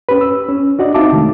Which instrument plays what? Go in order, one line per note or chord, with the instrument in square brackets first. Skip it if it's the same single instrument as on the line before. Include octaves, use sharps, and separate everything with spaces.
[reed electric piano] C#4 G4 B4
E6
C#4
D4 F#4 D5 D#5
C4 D#4 E5 F5 A5 D6
C3 D#3 G#3 A3